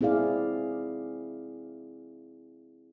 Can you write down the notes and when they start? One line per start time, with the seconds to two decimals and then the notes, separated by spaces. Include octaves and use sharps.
0.01 C4 E4 G#4 D5 F5